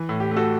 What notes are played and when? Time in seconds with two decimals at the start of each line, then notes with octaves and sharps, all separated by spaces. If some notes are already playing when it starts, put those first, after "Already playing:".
Already playing: E3
0.09 A2
0.20 G4
0.31 A3
0.37 F#4 A4